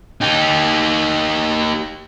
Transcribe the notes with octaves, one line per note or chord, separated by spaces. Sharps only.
D#4 G4